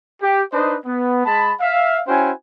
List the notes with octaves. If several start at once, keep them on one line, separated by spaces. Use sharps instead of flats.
G4
D4 D#4 B4 C5 D#5
B3
G#3 A5 B5
E5 F5
C#4 E4 F#4 C5 G5 G#5